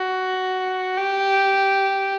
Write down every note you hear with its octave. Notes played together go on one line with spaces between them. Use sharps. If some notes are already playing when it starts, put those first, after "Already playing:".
Already playing: F#4
G4